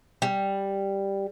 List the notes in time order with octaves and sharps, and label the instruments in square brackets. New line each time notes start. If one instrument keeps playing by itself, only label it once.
[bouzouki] G3